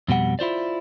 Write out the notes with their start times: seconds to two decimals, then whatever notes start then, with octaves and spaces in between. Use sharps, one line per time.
0.08 F2 B2 G3 F#5
0.39 E4 F4 C5 D5